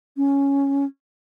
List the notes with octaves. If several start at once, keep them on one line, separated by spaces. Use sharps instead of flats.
C#4